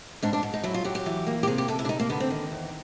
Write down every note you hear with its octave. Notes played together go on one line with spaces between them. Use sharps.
G#2 D4
D4
G#2
D#4
F#3 E4
F4
F#3 G4
G4
E3
A#3
G4
C3 G#4
G4
C3 A4
E4
D4
D3 D#4
A#3
D3 B3
C4
D#3
E2